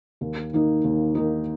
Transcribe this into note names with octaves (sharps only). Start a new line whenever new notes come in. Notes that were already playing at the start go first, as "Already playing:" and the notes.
D#2
D#3 A#3 D#4
D#2
D#3 A#3 D#4